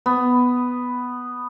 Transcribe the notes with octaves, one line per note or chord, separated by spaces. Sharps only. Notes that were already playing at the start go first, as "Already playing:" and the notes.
B3